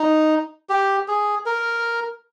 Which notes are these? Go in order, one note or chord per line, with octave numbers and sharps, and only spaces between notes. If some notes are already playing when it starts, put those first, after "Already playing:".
Already playing: D#4
G4
G#4
A#4